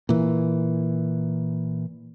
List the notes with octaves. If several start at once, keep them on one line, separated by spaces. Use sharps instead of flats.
A#2 E3